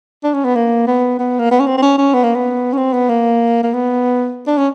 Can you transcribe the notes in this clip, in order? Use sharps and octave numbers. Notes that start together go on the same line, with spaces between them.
D4
C#4
B3
A#3
B3
B3
A#3
B3
C#4
C4
C4
C#4
C#4
B3
A#3
B3
C#4
C4
B3
A#3
A#3
B3
D4
C#4